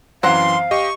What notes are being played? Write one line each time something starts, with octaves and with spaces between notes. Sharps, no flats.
F#2 E3 C4 F5 F#5 A#5 C6
G4 D#5 C#6